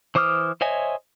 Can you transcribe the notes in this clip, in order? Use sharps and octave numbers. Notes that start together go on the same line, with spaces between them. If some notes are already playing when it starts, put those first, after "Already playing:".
E3 C5 D6 D#6 F6
C5 C#5 D#5 E5 G#5